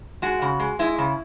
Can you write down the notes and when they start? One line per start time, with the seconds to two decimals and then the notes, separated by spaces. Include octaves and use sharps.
0.22 G#3 F#4
0.42 C#3
0.60 G#3
0.79 G#3 E4
0.98 C#3